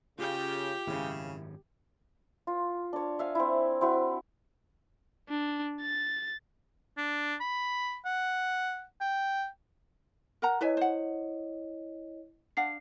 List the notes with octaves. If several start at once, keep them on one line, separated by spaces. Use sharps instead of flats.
C#3 F4 G4 G5
G#1 F#2 C#3 E4 E5
F4
D4 C#5
E5 F5 G#5
C4 E4
C4 E4 F#4
D4
A6
D4
B5
F#5
G5
A#4 F#5 A#5
E4 B4 C#5 D#5 E5 G#5
C5 F#5
D4 F5 F#5 C7